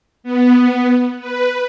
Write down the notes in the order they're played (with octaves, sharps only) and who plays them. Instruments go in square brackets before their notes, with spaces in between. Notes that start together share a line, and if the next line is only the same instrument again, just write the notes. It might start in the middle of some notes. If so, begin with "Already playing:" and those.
[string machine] B3
B4